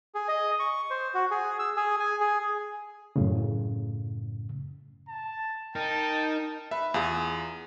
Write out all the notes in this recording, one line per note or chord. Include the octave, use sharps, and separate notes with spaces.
G#4
D#5
C#6
C5
F#4
G#4
E6
G#4
G#5
G#4
F#2 A2 C#3
A5
D#4 A#4 G5 A5
B4 E5
E2 F4 G#4